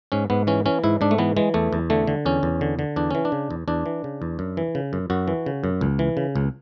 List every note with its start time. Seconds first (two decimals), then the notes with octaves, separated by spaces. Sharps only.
0.12 G#2 C#4
0.30 G#2 B3
0.47 E3 C#4
0.66 E3 C#4
0.84 G#2 E4
1.01 G#2 D4
1.11 A3
1.18 E3 B3
1.37 E3 G#3
1.54 E2 A3
1.73 E2
1.90 D3 A3
2.07 D3
2.26 E2 C#4
2.43 E2
2.61 D3
2.79 D3
2.96 E2 D4
3.11 E3 C#4
3.25 D4
3.32 C#3
3.51 E2
3.68 E2 D4
3.86 E3
4.04 C#3
4.22 E2
4.39 F#2
4.57 E3
4.75 C#3
4.93 F#2
5.10 F#2 F#4
5.28 E3
5.46 C#3
5.64 F#2
5.81 C#2
5.99 E3
6.17 C#3
6.36 C#2